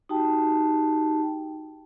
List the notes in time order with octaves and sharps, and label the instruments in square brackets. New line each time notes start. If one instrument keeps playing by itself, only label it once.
[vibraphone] D#4 F#4 G4 G5 A5